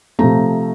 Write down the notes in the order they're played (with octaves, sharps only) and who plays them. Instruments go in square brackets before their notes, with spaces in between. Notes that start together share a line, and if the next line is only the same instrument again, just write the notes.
[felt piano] C3 F3 A3 A#5